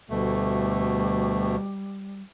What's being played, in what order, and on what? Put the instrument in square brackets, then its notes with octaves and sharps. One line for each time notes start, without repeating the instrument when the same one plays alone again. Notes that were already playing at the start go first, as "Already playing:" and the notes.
[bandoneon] D2 B2 A3 [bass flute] G3